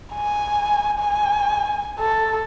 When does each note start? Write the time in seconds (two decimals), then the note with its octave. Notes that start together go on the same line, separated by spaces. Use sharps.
0.15 G#5
0.99 G#5
1.99 A4